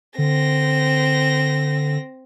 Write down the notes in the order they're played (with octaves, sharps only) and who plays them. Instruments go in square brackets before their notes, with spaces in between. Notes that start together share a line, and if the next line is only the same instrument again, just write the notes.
[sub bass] D3 [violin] C4 A#6